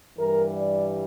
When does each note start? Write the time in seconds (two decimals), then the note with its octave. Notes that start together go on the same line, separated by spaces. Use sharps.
0.17 G2 E3 G3 A#4
0.55 D5